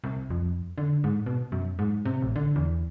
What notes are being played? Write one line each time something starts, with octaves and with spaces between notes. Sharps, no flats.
C2
F2
D3
G#2
B2
F#2
G#2
C3
A1
D3
E2